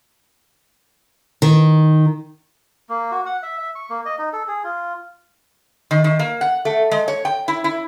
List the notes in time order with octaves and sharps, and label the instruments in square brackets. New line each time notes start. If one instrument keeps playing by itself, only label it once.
[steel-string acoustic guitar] D#3
[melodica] A#3
F#4
F#5
E5
E5
C#6
A#3
D#5
D#4
A4
G#4
F4
[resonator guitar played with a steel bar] D#3
D#3
A#3
F#5
A3
G#3
C#5
G5
E4
E4